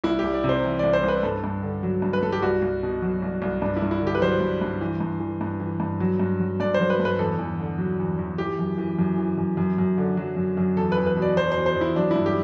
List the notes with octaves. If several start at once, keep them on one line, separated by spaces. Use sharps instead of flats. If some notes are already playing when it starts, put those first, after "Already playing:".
C2 E4
C2 G4
D5
C3
C5
E3
C2 D5
C5
C2 B4
G2 A4
G2
D3
F#3
G2
B4
G2 A4
G4
C2 F#4
C2
B2
F#3
C2
C2
G2 D4
E4
G2
E4
D3
G4
B4
F#3 C5
G2
G2
E3
G2
E3
G2
E3
G2
F#3
G2
F#3
G2 D5
C5
F#3
B4
G2
B4
E2 A4
E2
D3
F#3
E2
E2
E3 G4
F#2
E3
F#2
E3
F#2
F#2
F#2
D3
F#3
F#2
F#2
E2 A4
B4
E2
B4
B2
D5
F#3 C5
C5
E2
C5
E2
E4
F#3 D4
G2 E4
G4